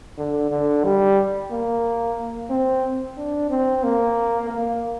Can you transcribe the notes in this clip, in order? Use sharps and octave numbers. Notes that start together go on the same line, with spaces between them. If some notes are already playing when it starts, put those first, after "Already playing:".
D3
D3
G3
A#3
C4
D4
C4
A#3
A#3